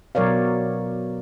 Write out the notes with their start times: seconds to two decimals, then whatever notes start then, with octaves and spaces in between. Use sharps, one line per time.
0.15 B2 F#3 A#4 C#5 D5 F5